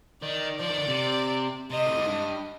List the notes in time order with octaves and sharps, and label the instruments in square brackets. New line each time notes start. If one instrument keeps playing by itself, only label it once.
[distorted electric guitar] D#3 [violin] D5
[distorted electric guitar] F3 [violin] D5
[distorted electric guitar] D#3
D3
C3
[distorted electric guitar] C3 [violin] D#5
[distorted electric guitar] A2
G#2
G2